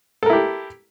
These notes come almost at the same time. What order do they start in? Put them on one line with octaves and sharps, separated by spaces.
A4 A#4 E4 G4